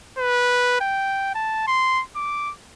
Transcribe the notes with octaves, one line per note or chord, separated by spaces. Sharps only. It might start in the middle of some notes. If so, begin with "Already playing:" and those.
B4
G5
A5
C6
D6